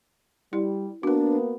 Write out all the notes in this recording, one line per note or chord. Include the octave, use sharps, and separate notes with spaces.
G3 E4
A#3 B3 D4 F#4 B4